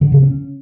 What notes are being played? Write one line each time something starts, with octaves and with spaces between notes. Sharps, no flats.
D3
C#3
C#4